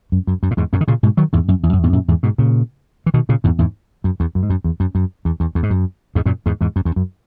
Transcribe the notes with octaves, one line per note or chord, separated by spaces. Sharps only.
F#2
F#2
F#2
A#2
E2 G#2
F#2 A#2
D#3
A#2 C#3
G#2 B2
D#3 F#3
E2 G#2
F#2
E2
F#2
E2 G#2
F#2 A#2
E2 G#2
G#2 B2
A#2 C#3
E3
B2 D#3
A#2 C#3
E2 G#2
E2 G#2
F#2
E2
F#2
G#2
F#2
E2
F#2
F#2
E2
E2
E2
G#2
F#2
E2 G#2
F#2 A#2
E2 G#2
E2 G#2
F#2
E2
F#2